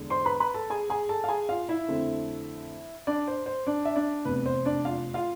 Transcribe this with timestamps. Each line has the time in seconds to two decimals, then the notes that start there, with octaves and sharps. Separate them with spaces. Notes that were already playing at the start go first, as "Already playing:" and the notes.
Already playing: E2 D3 G#3
0.10 C5 C6
0.25 B4 B5
0.40 B4 B5
0.54 A4 A5
0.70 G#4 G#5
0.90 G#4 G#5
1.09 A4 A5
1.24 F5
1.29 G#4 G#5
1.49 F4 F5
1.69 E4 E5
1.88 F2 D3 A3 C4
3.07 D4 D5
3.28 C5
3.46 C5
3.67 D4 D5
3.85 E5
3.96 D4 D5
4.25 F1 E2 C3 B4
4.46 C5
4.65 D4 D5
4.85 F4 F5
5.14 F4 F5